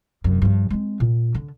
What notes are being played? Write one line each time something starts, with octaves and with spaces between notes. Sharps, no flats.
F1 F#2
G2 F3
G#3 C4
A#2
D3